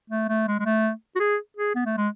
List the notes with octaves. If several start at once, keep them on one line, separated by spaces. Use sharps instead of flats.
A3
A3
G#3
G#3
A3
F#4
G#4
G#4
B3
A3
G#3